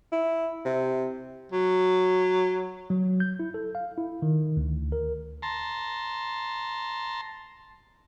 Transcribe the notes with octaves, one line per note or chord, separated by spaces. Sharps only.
E4
C3
F#3
F#3
G6
E4
A4
F5
E4
D#3
D2
A#4
A5 A#5 C6